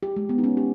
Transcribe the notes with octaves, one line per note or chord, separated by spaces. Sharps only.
G4
G#3
B3
D#4
C#4
G4